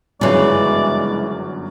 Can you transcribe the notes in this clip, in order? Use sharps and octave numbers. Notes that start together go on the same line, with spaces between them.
G1 F#2 C#3 E3 G#3 D5